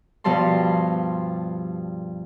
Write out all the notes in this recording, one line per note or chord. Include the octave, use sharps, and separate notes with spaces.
G2 B2 F3 G3 A5 C6